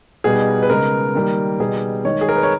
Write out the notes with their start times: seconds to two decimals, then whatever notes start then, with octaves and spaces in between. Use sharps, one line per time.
0.24 B2 G3 B3 D#4 G#4
0.63 B4
0.70 C#3 G#3 B3 D#4 A#4
1.15 D#3 G3 A#3
1.60 B2 G3 B3 D#4 G#4
2.05 D#3 G#3 D#4 C#5
2.21 G#4
2.29 A#4
2.36 B4
2.43 C#5